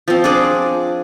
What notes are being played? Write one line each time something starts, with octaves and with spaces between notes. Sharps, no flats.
F3 C4
D4 G#4 D5